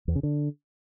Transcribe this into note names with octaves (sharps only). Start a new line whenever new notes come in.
E2
C#3
D3